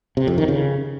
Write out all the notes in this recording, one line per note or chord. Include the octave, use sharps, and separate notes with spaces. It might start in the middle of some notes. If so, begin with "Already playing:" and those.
C3
F2
D#3
C#3